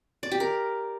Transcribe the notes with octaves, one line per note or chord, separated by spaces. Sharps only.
D5
G4
A#4